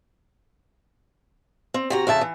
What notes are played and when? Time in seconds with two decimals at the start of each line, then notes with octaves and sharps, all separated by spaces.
1.74 C4
1.90 C3 F#4 A#5
2.07 F2 C#3 E5 A5
2.21 E3